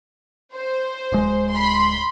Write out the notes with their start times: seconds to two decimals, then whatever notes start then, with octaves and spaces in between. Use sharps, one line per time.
0.54 C5
1.12 D1 G#3
1.51 B5 C6